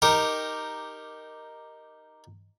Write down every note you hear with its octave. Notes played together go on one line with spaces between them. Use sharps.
D#4 G4 A#4